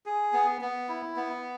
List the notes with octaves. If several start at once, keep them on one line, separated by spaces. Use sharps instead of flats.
G#4
B3
B3
E4
B3